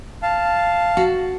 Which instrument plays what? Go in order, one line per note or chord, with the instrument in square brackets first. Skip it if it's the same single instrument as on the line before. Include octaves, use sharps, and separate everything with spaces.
[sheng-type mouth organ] F5 A5
[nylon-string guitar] F#4